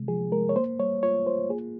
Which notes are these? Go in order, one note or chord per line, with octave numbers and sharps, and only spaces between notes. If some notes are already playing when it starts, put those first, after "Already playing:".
Already playing: C3 D#3 G#3
F3 G#4
G#3 A#4
C#5
A#3 C5
G3 C#5
F4 C#5
F4 C5
A#3 G#4